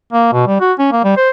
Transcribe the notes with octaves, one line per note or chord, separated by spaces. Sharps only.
A#3
B2
G3
F#4
C#4
A#3
G3
C5